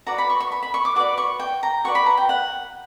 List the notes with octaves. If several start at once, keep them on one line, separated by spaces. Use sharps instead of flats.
F#4 B4 D5 A#5
B5
C#6
C#6
B5
B5
C#6
D6
F#4 B4 D5 D6
C#6
G5
A#5
F#4 B4 D5 C#6
B5
A#5
G5
F#5